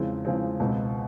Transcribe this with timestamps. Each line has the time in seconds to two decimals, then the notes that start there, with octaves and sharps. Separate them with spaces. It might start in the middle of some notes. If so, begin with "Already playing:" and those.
Already playing: E2 C#3 F3 G#3 C4
0.25 E2 C#3 F3 G#3 C4
0.60 C#2 B2 G#3 C4